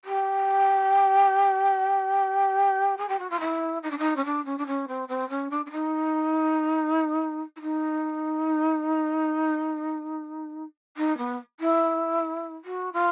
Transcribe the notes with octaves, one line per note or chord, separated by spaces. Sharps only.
G4
G#4
G4
F#4
F4
E4
D#4
D4
D#4
C#4
D4
C#4
D4
C#4
C4
C4
C#4
D4
D4
D#4
E4
D#4
D#4
B3
E4
F#4
F4